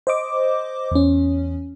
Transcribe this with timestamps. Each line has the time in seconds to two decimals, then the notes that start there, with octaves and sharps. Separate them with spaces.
0.07 C5 D#5 D6
0.91 E2 C#4